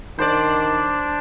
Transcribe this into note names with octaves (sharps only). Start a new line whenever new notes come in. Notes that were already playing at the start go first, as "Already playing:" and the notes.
D#3 D4 C5 D5